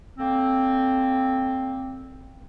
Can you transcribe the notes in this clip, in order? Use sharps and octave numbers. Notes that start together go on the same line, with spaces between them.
D3 A#3 C4